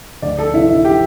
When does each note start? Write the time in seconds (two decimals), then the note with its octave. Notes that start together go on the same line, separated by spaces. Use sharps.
0.22 D2 D5
0.38 A4
0.54 C3 E3 E4
0.69 E4
0.85 G4